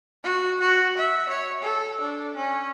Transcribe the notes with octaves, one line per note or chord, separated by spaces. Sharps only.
F#4
F#4
E5
C#5
A4
D4
C#4